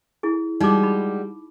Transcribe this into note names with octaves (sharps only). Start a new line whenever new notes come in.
E4 G#4
G3 G#3 D#4 F#4 D6
B5